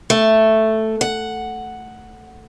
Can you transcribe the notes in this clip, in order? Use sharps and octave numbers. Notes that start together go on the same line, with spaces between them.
A3
F#5